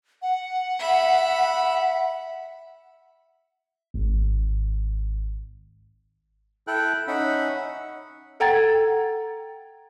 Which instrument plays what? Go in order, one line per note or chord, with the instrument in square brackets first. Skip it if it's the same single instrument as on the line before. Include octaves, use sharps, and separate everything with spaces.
[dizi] F#5
[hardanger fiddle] E5 B5
[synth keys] G#1
[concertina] E4 A4 G5 F#6
C#4 D#4 E5 F#5 B5
[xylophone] A4 F#5 G5 A#5 G#6 A6